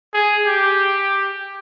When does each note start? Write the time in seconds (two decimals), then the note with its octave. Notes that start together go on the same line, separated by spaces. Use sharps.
0.14 G#4
0.46 G4